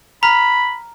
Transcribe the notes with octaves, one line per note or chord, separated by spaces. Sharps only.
A#5 B5 F6